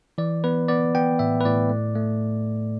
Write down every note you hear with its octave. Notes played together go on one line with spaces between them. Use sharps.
E3 D5
B3 B4
B3 D5
B3 G5
A2 E5
B4
A2 D5
A3
A3